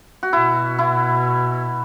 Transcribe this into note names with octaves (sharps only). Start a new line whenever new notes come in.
F#4
B2 E4
E4